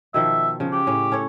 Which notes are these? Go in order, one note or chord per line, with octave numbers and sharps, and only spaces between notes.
B2 D#3 F3 E5
C#3 F3
G4 F#5
A2 C#4
C#4 A4 C#5